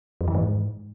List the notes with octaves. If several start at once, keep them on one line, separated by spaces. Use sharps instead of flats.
F2
E3
G#2